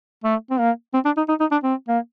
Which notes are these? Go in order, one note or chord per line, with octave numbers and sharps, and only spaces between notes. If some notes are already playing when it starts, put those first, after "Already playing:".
A3
C4
A#3
C4
D4
D#4
D#4
D#4
D4
C4
A#3